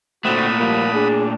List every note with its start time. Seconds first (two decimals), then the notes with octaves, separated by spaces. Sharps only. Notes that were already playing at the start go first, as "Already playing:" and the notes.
0.25 A#2 D3 A3 C4 F#4 F#5 B5 D#6
0.59 F3 G3 A#3
0.93 D4 G#4